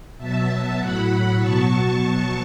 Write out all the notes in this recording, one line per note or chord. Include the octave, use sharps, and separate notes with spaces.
B2 F#3 E5 A5
A2 F#3 F#5 B5
B2 F#3 A5 C#6